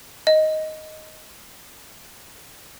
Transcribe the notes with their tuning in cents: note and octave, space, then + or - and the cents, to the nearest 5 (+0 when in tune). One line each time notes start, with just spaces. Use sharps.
D#5 +5